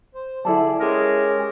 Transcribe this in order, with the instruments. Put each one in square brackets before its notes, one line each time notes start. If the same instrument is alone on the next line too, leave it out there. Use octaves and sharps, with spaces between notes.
[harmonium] C5
[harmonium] D3 G#4 D5 [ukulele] E4 A4 A5
[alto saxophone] G#3 [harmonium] C#4 G4 [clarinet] A#4